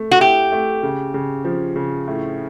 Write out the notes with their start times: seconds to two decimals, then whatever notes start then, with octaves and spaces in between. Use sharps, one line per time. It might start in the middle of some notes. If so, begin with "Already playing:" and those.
Already playing: A3
0.11 F#4
0.21 E4 G4
0.52 A3
0.83 C#3
1.14 C#3
1.45 F3
1.76 C#3
2.07 A2